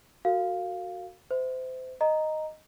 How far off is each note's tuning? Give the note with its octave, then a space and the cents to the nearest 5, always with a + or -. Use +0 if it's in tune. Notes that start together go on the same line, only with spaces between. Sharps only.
F#4 +0 A#4 -45 F5 +0
C5 -30 E5 -25
D#5 +0 A#5 +0